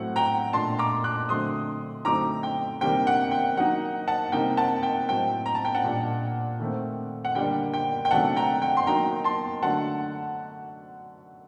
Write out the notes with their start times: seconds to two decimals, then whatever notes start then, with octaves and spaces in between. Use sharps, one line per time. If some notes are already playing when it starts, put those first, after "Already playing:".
Already playing: A2 F#3 A3 C4 F#5
0.16 G5 A#5
0.53 A#2 A3 D4 A5 C6
0.79 A#5 D6
1.04 D6 F#6
1.29 D3 F#3 A3 C4 C6 D#6
2.05 D3 F#3 A3 C4 D#4 A#5 D6
2.43 G5
2.81 C3 D#3 G3 A#3 D4 G5
3.07 F#5
3.31 G5
3.57 F#3 A#3 D#4 F#5
4.08 F#5 A5
4.32 C3 G3 A#3 D#4 G5
4.57 F#5 A5
4.83 G5
5.08 A2 F#3 C4 G5
5.46 A#5
5.55 A5
5.65 G5
5.75 F#5 A5
5.84 A#2 G3 D4
6.60 D#3 A3 C4
7.25 F#5
7.35 D3 G3 A#3 D4 G5
7.74 G5
8.05 G5
8.11 C3 D#3 F#3 A3 D4 F#5 A5
8.36 G5 A#5
8.62 G5
8.77 C6
8.87 F#3 A#3 D#4 G5 A#5
9.24 A5 C6
9.62 D3 F#3 A3 D4 F#5 A5